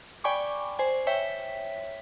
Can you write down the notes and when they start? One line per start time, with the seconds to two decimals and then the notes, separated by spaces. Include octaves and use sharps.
0.24 D5 G5 G#5 B5 C#6 D6
0.79 C5 G#5
1.07 C#5 E5 G5 B6